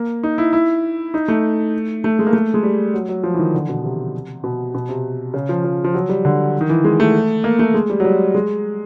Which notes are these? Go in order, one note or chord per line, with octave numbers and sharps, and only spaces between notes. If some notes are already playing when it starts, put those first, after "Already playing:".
Already playing: A#3
D#4
E4
E4
D#4
A3
A3
G#3
A#3
A3
G#3
G3
F#3
F#3
F3
E3
D#3
D3
B2
C3
B2
B2
C3
C#3
F3
F3
F3
F#3
G3
D3
D#3
E3
G#3
A3
A#3
A3
G#3
G3
F#3
G3
G#3